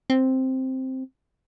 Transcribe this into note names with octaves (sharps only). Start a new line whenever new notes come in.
C4